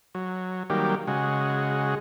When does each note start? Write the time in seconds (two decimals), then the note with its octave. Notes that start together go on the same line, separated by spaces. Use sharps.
0.15 F#3
0.70 D#3 F#3 G3 A#3 G4
1.07 C#3 G#3 F#4